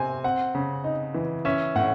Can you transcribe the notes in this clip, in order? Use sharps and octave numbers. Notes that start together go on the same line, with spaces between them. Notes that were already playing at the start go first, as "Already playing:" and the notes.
Already playing: C3 C4 G#5
C4 F#5
C#3
D#4
E3
C#4 E5
A2 F#5